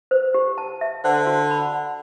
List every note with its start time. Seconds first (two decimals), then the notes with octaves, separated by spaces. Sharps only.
0.11 C5
0.34 G4
0.58 A5
0.81 E5
1.04 D3 C5
1.27 F#4
1.51 B5
1.73 F#5